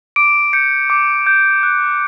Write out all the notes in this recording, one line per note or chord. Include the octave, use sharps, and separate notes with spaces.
D6 D7
G6 C#7
D6
G6
F#6